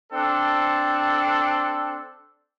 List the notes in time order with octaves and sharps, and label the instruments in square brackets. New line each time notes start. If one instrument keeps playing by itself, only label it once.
[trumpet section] C4 D4 A4